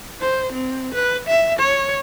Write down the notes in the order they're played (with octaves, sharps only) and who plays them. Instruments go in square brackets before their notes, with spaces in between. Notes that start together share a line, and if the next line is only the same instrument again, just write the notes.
[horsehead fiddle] C5
C4
B4
E5
C#5